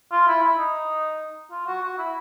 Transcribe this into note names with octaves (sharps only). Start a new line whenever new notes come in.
F4
E4
E4
D#4
F4
F#4
F#4
E4